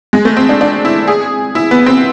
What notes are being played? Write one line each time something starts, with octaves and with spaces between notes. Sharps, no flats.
G#3
A3
C4
D4
D4
E4
G#4
E4
B3
C4